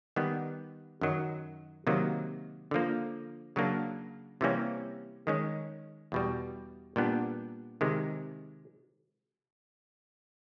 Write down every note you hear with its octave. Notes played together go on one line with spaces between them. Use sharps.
D#3 G3 B3
F#2 D#3 F#3
C3 D#3 F#3 A#3
D3 F3 A#3
C#3 F#3 A#3 D4
C3 E3 G3 A#3 C#4
D#3 G#3 C#4
E2 B2 G3
A#2 G3 B3 D4
C3 D#3 G#3